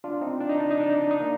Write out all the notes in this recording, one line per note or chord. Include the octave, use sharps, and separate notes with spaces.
D4 F4
C4 D#4
D4
D#4
D4
D#4
D4
D#4
D4
D#4
A#3 D4